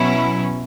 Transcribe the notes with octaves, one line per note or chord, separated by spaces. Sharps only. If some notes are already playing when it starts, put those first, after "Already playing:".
Already playing: B2 F#3 C#4 E4